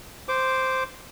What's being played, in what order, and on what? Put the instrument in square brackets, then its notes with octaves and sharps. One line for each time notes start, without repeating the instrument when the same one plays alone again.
[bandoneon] C5 D6